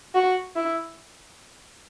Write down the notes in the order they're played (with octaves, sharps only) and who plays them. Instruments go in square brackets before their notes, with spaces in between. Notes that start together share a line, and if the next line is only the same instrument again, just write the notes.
[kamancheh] F#4
E4